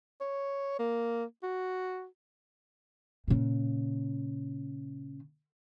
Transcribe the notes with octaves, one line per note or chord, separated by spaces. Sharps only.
C#5
A#3
F#4
A#2 C#3